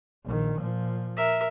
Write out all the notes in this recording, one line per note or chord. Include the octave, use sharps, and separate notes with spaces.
A#1 D#3
A#2 F3
A#4 E5